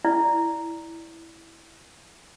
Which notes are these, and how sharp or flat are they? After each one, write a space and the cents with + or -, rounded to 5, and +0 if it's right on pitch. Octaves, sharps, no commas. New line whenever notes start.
E4 +0 D5 +0